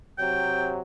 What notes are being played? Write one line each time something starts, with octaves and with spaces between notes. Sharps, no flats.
C3 F#3 G5